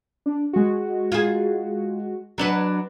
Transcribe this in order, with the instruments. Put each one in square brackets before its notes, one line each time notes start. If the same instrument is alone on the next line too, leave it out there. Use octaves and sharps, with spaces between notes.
[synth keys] D4
G#3 F#4
[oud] F4 G#4
F#3 D4 B4